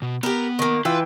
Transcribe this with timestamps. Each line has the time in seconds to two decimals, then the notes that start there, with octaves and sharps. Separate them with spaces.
0.02 B2
0.23 B3 G4 A#4
0.59 D#3 A#3
0.85 E3 F4 B4 G5 E6